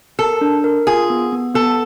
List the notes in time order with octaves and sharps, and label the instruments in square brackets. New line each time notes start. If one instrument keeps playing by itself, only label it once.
[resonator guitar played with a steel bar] A4 [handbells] A#4
[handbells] D4
A#4
[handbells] F4 [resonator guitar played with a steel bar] G#4
[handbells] B3
B3
[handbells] B3 [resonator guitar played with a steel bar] A4